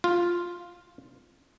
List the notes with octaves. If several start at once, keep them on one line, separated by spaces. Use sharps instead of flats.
F4